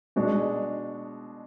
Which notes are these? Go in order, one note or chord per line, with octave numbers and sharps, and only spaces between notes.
B2 G#3 D4 F#4